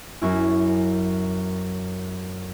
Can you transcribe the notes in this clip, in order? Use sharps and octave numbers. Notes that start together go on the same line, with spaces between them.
F#2 C#4 E4